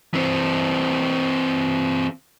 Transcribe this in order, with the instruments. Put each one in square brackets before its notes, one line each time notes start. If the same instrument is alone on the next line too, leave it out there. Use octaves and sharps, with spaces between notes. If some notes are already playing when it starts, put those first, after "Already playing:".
[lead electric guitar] E3 C4